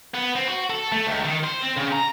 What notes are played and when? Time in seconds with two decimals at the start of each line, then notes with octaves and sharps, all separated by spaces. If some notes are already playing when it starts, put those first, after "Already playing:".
0.14 B3
0.36 C4
0.48 F#4
0.70 A4
0.92 A3
1.07 C#2
1.25 D#3
1.44 C5
1.63 C4
1.77 C#3
1.93 A#5